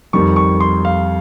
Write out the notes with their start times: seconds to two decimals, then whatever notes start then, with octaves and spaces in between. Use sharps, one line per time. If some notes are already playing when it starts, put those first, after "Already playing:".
0.13 F2 D#3 G3 C#6
0.36 C#6
0.60 C6
0.85 F5